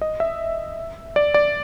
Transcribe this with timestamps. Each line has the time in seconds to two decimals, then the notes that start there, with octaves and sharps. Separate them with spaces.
0.01 D#5
0.20 E5
1.16 D5
1.34 D5